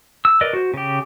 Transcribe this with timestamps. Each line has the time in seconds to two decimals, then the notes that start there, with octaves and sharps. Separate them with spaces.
0.25 E6
0.41 A#4 B4 D5 D#5
0.53 F#4 C5
0.74 C#3 G4